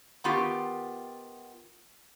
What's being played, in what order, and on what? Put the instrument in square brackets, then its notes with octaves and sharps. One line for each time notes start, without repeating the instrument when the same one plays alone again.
[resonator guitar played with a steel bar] D#3 B3 F4 G4